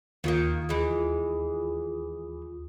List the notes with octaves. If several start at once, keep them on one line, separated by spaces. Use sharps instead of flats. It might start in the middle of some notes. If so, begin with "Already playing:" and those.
D#2 D#3 F#3 A#3 F4 D#6
E3 G#3